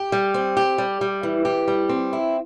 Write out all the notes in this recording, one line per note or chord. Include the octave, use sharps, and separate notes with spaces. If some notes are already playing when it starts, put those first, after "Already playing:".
Already playing: G4
G3
C4
G4
G3
G3
E3
G4
G3
C4
E4